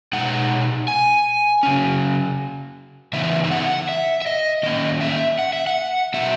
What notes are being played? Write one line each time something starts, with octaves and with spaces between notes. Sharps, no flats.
B2 G#3 D#4 F#5
G#5
C#3 F#3 C#4
C#3 E3 B3 D#4 E5
E5
F#5
E5
E5
D#5
D#3 A#3 C#4 D#5
E5
F#5
E5
F#5
B2 F#3 B3 E5